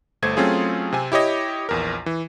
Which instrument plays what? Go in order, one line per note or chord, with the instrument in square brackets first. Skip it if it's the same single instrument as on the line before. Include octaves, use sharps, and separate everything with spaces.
[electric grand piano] G1 A3 C5 G#6
F#3 A3 C4 C#4 F4 G#4
C3 C4 G#5
E4 G4 C#5 D#5
A#1 E2 A#4
E3